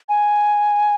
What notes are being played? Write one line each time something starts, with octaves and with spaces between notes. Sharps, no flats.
G#5